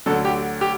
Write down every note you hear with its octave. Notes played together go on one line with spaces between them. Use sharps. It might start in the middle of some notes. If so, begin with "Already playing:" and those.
D2 D3 F#3 A4
G4
G4